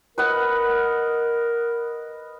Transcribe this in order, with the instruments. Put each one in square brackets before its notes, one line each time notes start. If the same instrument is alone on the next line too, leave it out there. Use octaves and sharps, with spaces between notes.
[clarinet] A#4 [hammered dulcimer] B4 D#5 F#5